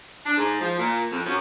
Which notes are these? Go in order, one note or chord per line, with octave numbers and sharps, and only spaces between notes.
D4
G#2
F3
A#2
F2
F#2